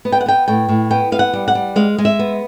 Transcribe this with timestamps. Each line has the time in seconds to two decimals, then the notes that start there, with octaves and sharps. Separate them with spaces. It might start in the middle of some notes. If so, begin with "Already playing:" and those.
0.05 B3
0.12 G5
0.20 F#5
0.26 B3 G5
0.48 A2 G5
0.69 A2
0.90 B3 G5
1.12 B3 F5
1.19 F#5
1.33 G3
1.48 F#5
1.55 G3
1.76 G#3 F5
1.98 G#3
2.05 E5
2.19 B3